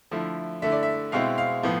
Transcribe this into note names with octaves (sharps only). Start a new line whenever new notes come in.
D3 F3 A3 E4
D3 A3 E4 E5
D5
E5
B2 G#3 C4 E4 F5
F5
A2 F3 B3